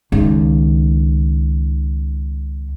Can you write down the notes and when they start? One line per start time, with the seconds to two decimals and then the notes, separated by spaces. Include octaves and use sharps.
0.12 C#2 D#3